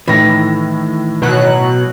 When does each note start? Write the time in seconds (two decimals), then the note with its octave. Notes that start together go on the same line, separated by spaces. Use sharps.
0.08 A2 D#3 E3 A#6
1.22 B2 F#3 F#6